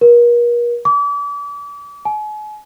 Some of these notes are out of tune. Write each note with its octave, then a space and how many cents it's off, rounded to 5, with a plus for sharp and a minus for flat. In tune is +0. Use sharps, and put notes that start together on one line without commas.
A#4 +40
D6 -35
G#5 +40